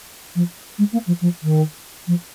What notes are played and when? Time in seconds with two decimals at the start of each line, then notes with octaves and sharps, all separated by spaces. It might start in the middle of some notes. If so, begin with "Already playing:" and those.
0.35 F3
0.78 G#3
0.92 A#3
1.07 F3
1.21 F3
1.42 D#3
2.07 F3